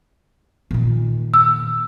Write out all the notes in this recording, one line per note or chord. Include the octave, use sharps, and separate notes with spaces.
A#2 D#3
E6